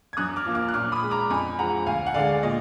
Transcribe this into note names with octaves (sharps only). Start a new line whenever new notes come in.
G#6
F#2 D#6 F#6
D6 F6
F3 A#3
D6 F6
F#6
A#2 D6 F6
B5 D#6
G#3
A#5 D6
F2 G#5 B5
F3 G#3 F#5 A#5
D2 F5 G#5
F#5
D3 G#3 D5 F5
A#2 D#5